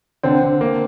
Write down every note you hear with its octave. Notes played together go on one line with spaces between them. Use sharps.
D3 C4
D3
A#3